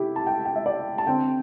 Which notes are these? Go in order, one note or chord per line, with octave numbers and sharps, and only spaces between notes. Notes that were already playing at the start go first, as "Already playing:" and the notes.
Already playing: C3 A3 C4 E4 G4
A5
G5
G5
E5
D5
A5
D3 C4 G5